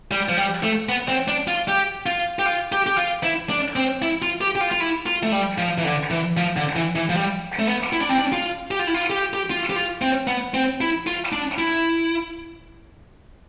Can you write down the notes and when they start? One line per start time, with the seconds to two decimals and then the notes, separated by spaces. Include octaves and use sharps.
0.11 G3
0.29 F3
0.37 G3
0.63 A3
0.89 B3
1.08 C4
1.28 D4
1.48 F4
1.68 G4
2.06 F4
2.39 G4
2.46 F4
2.72 G4
2.87 G4
2.98 F4
3.24 E4
3.50 D4
3.76 C4
4.02 E4
4.22 F4
4.41 G4
4.56 G4
4.61 F4
4.72 F4
4.80 E4
5.06 F4
5.23 A3
5.32 G3
5.58 F3
5.78 E3
5.85 D3
6.11 E3
6.37 F3
6.56 D3
6.76 E3
6.96 E3
7.10 F3
7.16 G3
7.59 A3
7.67 B3
7.93 E4
8.01 D4
8.09 C4
8.18 D4
8.32 F4
8.71 G4
8.79 F4
8.87 E4
8.94 F4
9.10 G4
9.34 G4
9.50 F4
9.70 G4
9.76 F4
10.02 C4
10.27 B3
10.54 C4
10.81 E4
11.07 F4
11.32 D4
11.58 E4